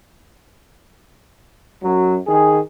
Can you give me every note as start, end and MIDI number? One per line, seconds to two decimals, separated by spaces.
1.84 2.18 42
1.84 2.18 54
2.28 2.60 51
2.28 2.60 68